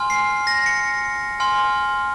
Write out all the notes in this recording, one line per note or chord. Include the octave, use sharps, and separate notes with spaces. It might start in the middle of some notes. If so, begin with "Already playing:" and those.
Already playing: G#5 C6 F6
C7
A#6
C#7
G#5 C6 F6